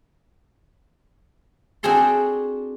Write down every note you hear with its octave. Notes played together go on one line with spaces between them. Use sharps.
C4 D4 F#4 G#4 A4 C6